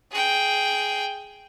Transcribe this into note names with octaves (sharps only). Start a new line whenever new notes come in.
G#4 G5